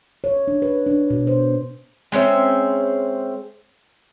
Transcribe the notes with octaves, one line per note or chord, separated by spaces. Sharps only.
C#5
D4
B4
D4
B2
C5
G#3 C4 C#4 E5